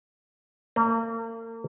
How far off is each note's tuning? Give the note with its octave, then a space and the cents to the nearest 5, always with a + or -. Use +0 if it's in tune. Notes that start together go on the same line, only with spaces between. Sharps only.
A#3 -40